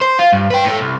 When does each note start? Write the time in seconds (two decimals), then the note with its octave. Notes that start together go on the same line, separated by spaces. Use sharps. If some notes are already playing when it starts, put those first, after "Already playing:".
0.01 C5
0.19 F4
0.33 G2
0.50 B4 G5
0.65 A2 A4
0.81 C2